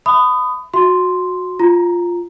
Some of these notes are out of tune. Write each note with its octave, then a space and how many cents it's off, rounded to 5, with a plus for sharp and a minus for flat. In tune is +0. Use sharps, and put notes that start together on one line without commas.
E5 +0 B5 +30 D#6 -10
F#4 -20 E5 +0 C6 +0
F4 +0 A#5 +0